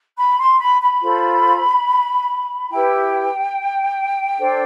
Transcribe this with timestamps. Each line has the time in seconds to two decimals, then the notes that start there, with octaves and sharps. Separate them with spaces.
0.18 B5
0.39 C6
0.60 B5
0.81 B5
1.02 F4 A4 C5
2.70 E4 G4 B4 G5
4.39 D4 A4 C5